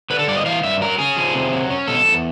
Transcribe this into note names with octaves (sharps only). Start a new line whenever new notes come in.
D3 B4
A4
G2 D5
D#5
E3 F5
G2 E5
F#3 A#4
C#4 G#4
F3
C3
F#3
C#4
B2 A4
E2